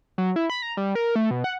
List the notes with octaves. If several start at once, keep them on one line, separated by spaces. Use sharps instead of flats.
F#3
E4
B5
A#5
G3
A#4
A3
B2
F#5